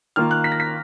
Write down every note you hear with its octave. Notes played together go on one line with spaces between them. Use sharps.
D#3 A#3 F4 F6
F#6
B6
A#6
B6